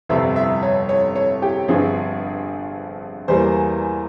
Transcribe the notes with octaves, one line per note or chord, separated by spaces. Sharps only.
G1 F2 C3 G3 C4 E5
E5
C#5
C#5
C#5
G4
G1 G2 F3 C4 G#4
E2 E3 G3 A#3 C5